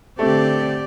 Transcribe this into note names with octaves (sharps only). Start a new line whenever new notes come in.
D3 A3 C4 G4 D5